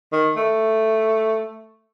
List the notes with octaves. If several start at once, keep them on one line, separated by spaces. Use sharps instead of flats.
D#3
A3